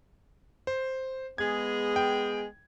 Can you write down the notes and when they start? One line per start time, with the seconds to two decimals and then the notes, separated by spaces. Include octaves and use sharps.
0.67 C5
1.38 G#3 B3 G#4 G#6
1.96 G5